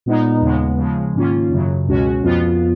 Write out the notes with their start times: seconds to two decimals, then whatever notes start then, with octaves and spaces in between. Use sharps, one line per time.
0.06 A#2 G#3 B3 D#4
0.41 D#2 C#3 G#3 B3
0.78 C#3 F3 G#3
1.15 G#2 D#3 A#3 C#4 F4
1.50 F#2 C#3 F#3
1.88 C#2 B2 G#3 C#4 F#4
2.23 F2 F3 B3 F4